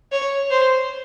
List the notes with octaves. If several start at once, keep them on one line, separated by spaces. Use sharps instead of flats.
C#5
C5